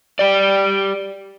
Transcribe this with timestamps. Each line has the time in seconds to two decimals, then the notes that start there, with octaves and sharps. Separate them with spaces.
0.19 G4 D5